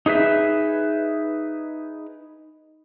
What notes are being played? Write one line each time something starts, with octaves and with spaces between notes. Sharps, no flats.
D#4 G#4 B4 E5